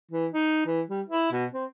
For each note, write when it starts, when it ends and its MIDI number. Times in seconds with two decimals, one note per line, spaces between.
0.11 0.27 52
0.33 0.65 63
0.66 0.81 52
0.90 1.01 55
1.06 1.29 64
1.32 1.45 47
1.54 1.65 60